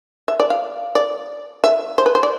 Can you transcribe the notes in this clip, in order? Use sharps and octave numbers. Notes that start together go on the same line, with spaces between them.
E5
D5
F5
D5
E5
C5
B4
C5
D5